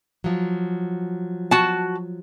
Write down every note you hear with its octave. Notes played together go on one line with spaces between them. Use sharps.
F3 F#3
F#4 A5